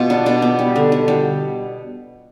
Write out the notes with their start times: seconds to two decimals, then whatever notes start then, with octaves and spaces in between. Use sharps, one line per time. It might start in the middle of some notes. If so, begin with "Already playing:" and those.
Already playing: B2 F4 G4
0.10 B3 D4
0.26 B2 D4
0.42 B3
0.59 G3
0.76 D3
0.92 D3
1.08 G3